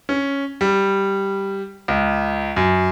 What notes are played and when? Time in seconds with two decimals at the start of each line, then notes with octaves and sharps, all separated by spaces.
0.09 C#4
0.61 G3
1.88 C#2
2.57 F#2